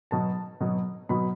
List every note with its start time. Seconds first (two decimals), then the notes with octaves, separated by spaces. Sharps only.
0.11 B2 F#3 B3 A5
0.61 B2 F#3 B3
1.09 B2 F#3 B3 B5